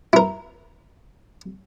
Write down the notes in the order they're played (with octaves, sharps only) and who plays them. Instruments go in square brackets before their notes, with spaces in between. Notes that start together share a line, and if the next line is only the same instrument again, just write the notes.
[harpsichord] E4 A#4